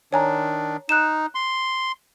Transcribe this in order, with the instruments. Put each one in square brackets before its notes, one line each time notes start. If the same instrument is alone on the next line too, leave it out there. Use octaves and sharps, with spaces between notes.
[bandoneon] D#3 D4 [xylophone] C#5 G#5 A#5
[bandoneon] D#4 [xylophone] F#6 E7
[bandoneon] C6